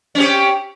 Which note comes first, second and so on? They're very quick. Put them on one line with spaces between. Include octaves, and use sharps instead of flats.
C#4 C4 G4